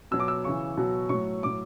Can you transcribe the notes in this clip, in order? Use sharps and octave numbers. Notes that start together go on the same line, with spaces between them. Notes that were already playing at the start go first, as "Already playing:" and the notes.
B2 F#3 E6
D6
E6
C#3 E3 C#6
B2 F#3
A2 F#3 C#6
A2 F#3 D6